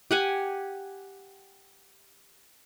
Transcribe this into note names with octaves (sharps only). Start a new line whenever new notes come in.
G4 F#5 G#5